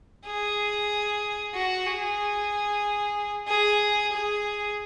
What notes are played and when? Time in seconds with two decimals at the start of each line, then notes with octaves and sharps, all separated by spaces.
0.26 G#4
1.55 F#4
1.86 G#4
3.48 G#4
4.13 G#4